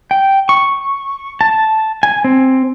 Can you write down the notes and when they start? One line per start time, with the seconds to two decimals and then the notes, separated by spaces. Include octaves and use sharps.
0.11 G5
0.49 C#6
1.41 A5
2.03 G#5
2.24 C4